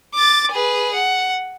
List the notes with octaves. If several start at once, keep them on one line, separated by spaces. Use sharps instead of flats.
D6 A6
G#4 B4
F#5